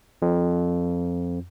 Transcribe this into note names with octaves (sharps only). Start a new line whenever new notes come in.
F2